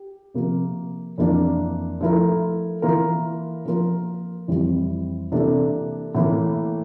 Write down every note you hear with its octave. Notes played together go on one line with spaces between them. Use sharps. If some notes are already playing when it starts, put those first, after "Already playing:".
Already playing: G4
C3 F3 A#3
F2 E3 A#3 D4
F3 A3 E4 A#4
E3 A#3 F4 A#4
F3 A#3 F4 A#4
F2 E3 G3 C4
C3 E3 A#3 D4 A4
A2 E3 A#3